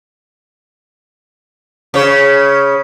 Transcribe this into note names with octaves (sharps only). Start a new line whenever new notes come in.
C#3 C#5